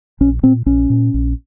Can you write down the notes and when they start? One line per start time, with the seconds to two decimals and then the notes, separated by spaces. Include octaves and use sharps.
0.20 A#1 C#4
0.43 A#2 C4
0.66 A#1 C#4
0.90 A#2
1.14 A#1